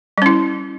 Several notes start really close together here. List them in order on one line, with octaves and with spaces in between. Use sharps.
G3 C#4 E4